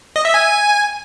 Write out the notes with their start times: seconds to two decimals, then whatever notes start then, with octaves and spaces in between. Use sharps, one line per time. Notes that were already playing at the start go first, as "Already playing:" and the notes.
0.16 D#5
0.25 E5
0.34 G#5